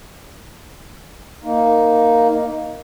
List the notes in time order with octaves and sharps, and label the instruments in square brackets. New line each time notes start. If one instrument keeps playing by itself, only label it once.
[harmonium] A#3 D#4